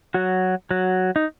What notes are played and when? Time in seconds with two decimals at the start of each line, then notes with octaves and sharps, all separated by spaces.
0.14 F#3 F#4
0.71 F#3 F#4
1.16 D#4